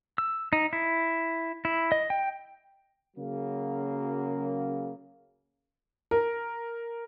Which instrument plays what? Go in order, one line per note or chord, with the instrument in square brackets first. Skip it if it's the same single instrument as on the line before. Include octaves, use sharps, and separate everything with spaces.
[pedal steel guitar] E6
D#4
E4
E4
D#5
G5
[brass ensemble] C#3 F#3 A#3
[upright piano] A#4